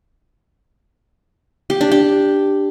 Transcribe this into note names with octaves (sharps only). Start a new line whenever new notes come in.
G4
D4
G4